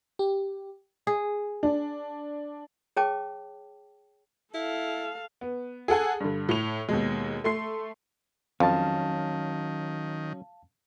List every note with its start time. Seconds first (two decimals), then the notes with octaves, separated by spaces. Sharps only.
0.19 G4
1.07 G#4
1.63 D4
2.97 G#4 C#5 G5 A5 D6
4.54 E4 A4 F5
5.41 B3
5.88 G#4 A4 F#5 G#5
6.20 G2 D3
6.49 A2 F7
6.89 D#2 B2 G#3
7.44 A3 C6 C7
8.60 F2 D#3 F#3 C#4 F5 A5